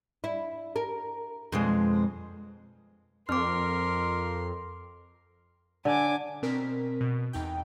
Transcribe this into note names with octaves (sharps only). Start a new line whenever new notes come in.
E4
A#4
F2 B2 G#3
F2 A#4 C6 D6 F6
D3 G#5 D6
B2 C4 A#4 B6
B2
E2 D#4 G5